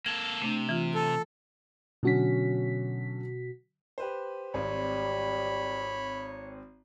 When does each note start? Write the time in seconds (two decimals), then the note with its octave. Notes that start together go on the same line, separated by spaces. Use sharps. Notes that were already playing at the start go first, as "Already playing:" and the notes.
0.06 A#3 A4 G#6
0.42 C3 A3 D4
0.69 E3 F4
0.94 A4
2.03 B2 D3 F#3 C#4 F#4 B6
3.98 G4 B4 C5
4.54 G#1 G3 C4 C#5 B5